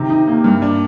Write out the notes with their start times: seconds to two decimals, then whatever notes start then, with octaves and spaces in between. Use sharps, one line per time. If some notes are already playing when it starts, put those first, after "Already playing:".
Already playing: C3 D#3
0.10 D#4
0.27 A#3
0.44 G2
0.62 D4